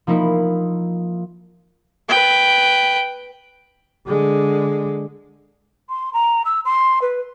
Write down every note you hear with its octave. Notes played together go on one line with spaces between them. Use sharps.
F3 A#3 D#4 E4
B4 G5
D3 G#3
C6
A#5
E6
C6
B4